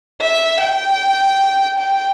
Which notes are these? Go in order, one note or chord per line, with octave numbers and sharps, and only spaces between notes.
E5
G5
G5